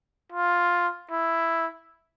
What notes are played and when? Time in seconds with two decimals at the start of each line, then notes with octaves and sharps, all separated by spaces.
0.32 F4
1.11 E4